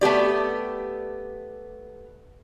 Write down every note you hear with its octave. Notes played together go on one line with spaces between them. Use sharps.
A3 B3 G4 D5